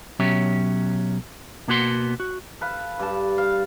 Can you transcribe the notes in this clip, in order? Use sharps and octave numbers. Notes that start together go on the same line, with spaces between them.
B2 F#3 C#4 G4 C#5 E5
B2 A#3 B3 F#4 B4 C6
F#4
A4 B4 F5
G2 A5
F5